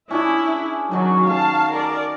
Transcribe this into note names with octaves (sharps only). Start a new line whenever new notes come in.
C#4 D4 E4 G#4
D#3 F#3 C#4 F#4
F5 A5
A#4 D5